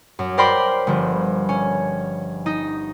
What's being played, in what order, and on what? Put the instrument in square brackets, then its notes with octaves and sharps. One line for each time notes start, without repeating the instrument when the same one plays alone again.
[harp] F#2
A#4 C5 D5 G5 B5 C6
G1 F3
C#4
D#4